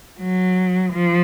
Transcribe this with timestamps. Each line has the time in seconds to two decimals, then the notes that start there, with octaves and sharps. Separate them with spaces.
0.19 F#3
0.92 F3